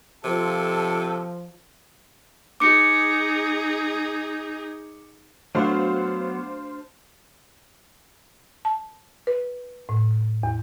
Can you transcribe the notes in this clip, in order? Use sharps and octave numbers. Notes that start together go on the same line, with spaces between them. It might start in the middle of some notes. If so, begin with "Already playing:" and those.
C3 F3 A4
D#4 G#4 D6 C#7
F#3 A3 B3 D4 F#4 C5 F5
A5
B4
A2
E2